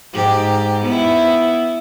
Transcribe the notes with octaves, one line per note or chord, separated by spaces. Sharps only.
G#2 G4
B3 E4